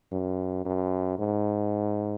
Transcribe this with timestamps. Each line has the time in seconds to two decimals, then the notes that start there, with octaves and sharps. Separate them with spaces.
0.11 F#2
0.65 F#2
1.19 G#2